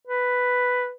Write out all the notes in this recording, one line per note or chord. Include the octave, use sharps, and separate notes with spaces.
B4